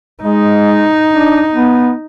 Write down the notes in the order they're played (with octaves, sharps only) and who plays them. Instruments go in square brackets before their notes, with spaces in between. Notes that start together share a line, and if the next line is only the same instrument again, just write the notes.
[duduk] G#3 [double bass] D#4
[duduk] D4
B3